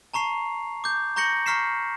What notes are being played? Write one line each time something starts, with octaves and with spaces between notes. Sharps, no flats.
A5 A#5 C#6 C7 F7
D6 G6
A#5 C#6 G6 A#6 C#7 F#7
A#5 C#6 F6 B6 C7 E7